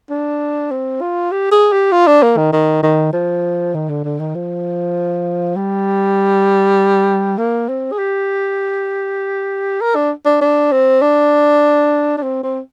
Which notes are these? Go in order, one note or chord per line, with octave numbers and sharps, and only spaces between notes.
D4
C4
F4
G4
G#4
G4
F4
D4
A#3
D#3
D#3
D#3
F3
D#3
D3
D3
D#3
F3
G3
A#3
C4
G#4
G4
A#4
D4
D4
D4
C4
D4
D4
C4
C4